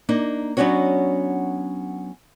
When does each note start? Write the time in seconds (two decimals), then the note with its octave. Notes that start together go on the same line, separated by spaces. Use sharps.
0.09 A#3 D4 D#4
0.57 F#3 B3 C#4 D4 F#4 C#5